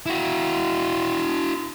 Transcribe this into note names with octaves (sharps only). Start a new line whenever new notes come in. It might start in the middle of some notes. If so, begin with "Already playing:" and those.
E4 F#4